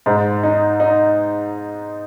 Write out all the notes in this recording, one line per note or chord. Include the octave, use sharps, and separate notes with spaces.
G#2
D#4
D#4